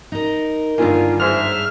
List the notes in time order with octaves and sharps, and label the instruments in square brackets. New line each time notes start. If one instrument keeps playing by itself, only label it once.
[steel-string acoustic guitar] D#4 A#4
[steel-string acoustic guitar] G2 G#5 [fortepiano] D3 D#3 A#3 [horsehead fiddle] F4
[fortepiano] G#2 G#3 [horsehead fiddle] C5 E5 [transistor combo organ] F6